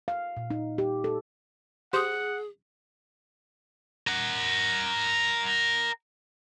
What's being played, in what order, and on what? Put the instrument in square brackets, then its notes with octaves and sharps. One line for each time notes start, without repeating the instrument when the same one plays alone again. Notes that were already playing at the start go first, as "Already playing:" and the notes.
[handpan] F5
A#2
D#4
G4
A4
[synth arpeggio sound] G4 C5 [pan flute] G#4 [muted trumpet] F#5 [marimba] C6 D#6
[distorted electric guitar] A#4 F#5